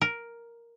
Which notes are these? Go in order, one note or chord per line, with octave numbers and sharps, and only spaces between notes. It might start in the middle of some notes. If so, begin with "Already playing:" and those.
A#4